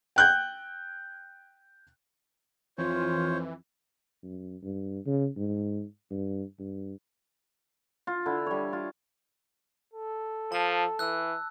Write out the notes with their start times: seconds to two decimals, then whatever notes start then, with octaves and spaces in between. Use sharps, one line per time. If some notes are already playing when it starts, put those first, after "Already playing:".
0.16 G5 F#6 G6
2.78 F2 E3 F4 C5 C#5
4.23 F#2
4.63 G2
5.06 C#3
5.37 G#2
6.10 G2
6.59 G2
8.07 F4
8.26 D3 E4
8.46 G3 C#5
8.73 F4
9.94 A4
10.52 F3 A5
10.99 E3 E6 F#6